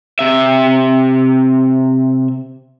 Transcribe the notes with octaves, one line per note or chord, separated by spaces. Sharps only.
C3 E5